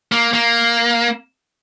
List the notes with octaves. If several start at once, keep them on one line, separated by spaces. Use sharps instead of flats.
A#3
A#3